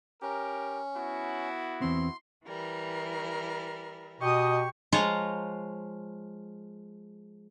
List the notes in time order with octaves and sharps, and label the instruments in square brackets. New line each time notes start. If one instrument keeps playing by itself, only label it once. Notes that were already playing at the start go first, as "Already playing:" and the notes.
[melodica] C#4 [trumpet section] G4 A#4
[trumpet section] B3 E4 F#4
[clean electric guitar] E2 C4 [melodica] C6
[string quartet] E3 G3 A#4
[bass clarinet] B2 [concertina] G4 C#6 [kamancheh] D#5 D#6
[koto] F3 G#3 F4 C#5 F5 A#5